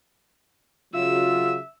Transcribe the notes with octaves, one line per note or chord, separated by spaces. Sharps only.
C#3 F#3 F4 E5 E6